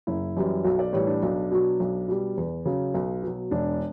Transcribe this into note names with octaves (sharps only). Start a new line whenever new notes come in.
F#1 E4
F#2 E3 G3
B1 F#4
D5
A2 E3 G3 C#5
D4
B1
B2 F#3
B1
B2 G3
E2
C#3 F#3
B1
B2 F#3
E1 D4